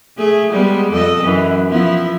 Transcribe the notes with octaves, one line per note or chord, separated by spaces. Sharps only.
A3 G#4
G3 G#3 B3
F2 A4 D#5
F#2 E3
F3 B3 E4